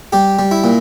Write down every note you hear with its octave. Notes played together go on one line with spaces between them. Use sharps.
G3 G4
G3
E4
A#2